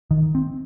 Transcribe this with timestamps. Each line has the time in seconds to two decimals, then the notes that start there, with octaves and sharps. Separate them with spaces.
0.11 D#3
0.35 C4